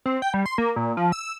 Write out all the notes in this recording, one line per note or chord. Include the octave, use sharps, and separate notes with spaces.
C4
G5
G3
C6
A#3
A#2
F3
E6